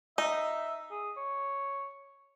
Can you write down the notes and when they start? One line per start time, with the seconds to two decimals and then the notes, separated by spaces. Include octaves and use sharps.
0.18 D#4 E5
0.91 G#4
1.17 C#5